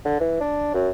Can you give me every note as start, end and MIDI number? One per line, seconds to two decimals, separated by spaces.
0.05 0.19 50
0.20 0.37 52
0.40 0.69 62
0.74 0.90 42